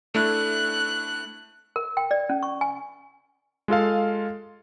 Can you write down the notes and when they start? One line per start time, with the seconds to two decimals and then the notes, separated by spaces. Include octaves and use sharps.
0.15 A3 D4 E4 F#6
1.76 A#4
1.97 G5
2.11 D5
2.29 C#4
2.43 C#6
2.61 G#5
3.68 G#3 F4 A4 F5